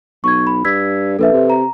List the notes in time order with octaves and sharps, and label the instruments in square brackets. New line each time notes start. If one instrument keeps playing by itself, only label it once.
[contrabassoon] B1 [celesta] C#6 G#6
[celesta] B5
[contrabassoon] G2 [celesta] E6 G#6 B6
[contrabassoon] A#1 [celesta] A4 B4 E5
[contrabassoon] C3
[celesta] A#5